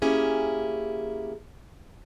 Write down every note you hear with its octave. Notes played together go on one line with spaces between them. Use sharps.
A#3 C#4 E4 G4 G#4